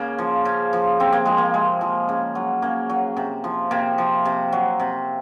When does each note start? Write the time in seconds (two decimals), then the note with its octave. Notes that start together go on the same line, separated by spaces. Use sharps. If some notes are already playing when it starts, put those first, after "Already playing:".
Already playing: C#3 A#3
0.18 F3
0.45 C#3
0.73 F3
1.00 C3 C4
1.12 A#3
1.25 F3 G#3
1.38 A#3
1.54 C3 G#3
1.81 F3
2.09 C#3
2.35 F#3
2.62 C#3 A#3
2.90 F#3
3.17 C3
3.44 F3
3.71 C3 A#3
3.98 F3
4.25 C3
4.52 F#3
4.80 C3